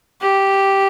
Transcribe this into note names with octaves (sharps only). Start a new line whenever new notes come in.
G4